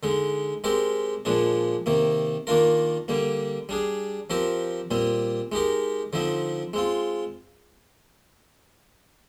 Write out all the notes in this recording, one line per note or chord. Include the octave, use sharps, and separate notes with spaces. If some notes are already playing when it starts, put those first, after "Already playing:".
D3 G#3 D#4
G#3 C4 G4 A#4
A#2 F3 G#3 D4
C3 D#3 A#3
D#3 A#3 D4 F4 A#4
D3 G3 A#3
G3 D4 G#4
F3 C4 G4 A#4
A#2 G3 C4
G#3 D#4 G4 A#4
D3 F3 C4 D#4
G#3 C4 F4